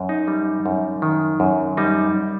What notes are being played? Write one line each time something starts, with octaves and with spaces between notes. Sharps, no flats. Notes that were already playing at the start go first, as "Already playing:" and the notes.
Already playing: F#2
D#4
G3
F#2
D#3
F#2
G3 D#4